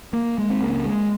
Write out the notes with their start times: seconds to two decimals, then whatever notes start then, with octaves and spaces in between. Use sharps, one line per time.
0.13 A#3
0.38 G#3
0.50 C4
0.62 C#2 C#3 A#3
0.85 G#3